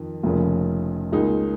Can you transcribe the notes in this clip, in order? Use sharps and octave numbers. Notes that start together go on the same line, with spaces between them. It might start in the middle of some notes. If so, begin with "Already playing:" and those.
Already playing: F2 D#3
F1 F2 C#3 A#3 C#4
C#2 C#3 A#3 D#4 G#4